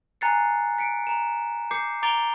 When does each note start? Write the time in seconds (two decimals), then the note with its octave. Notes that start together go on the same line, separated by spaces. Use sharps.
0.21 G#5 A#5 F#6 A6 C7 C#7
0.78 B6 C#7 D7
1.07 A#5 E7
1.71 D6 G6 C7 C#7
2.03 A#5 D6 A6 D7 F7 G7